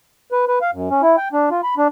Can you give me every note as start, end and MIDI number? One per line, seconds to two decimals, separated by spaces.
0.32 0.45 71
0.47 0.59 71
0.62 0.71 77
0.73 0.89 42
0.90 1.02 61
1.02 1.16 64
1.17 1.28 79
1.33 1.49 62
1.51 1.61 65
1.64 1.75 83
1.77 1.88 62